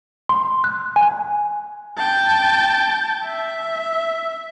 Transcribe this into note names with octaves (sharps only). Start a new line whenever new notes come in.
C6
F#6
G#5
G5 A5
E5